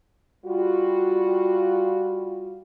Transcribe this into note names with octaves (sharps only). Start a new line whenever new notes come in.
G3 F4 F#4